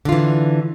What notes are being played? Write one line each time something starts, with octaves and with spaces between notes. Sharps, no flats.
D3 E3 F4